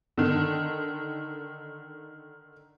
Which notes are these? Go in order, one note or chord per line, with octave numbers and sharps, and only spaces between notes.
D3 D#3